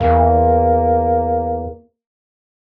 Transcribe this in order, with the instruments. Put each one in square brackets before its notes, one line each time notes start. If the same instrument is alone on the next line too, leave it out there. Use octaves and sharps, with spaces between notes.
[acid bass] E2 [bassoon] A#3